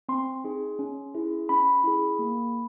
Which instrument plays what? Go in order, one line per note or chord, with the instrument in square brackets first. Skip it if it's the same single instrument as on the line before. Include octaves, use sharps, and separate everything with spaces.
[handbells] C4 C6
D#4 G#4
C#4
E4 G#4
C#4 B5
E4 G#4
A#3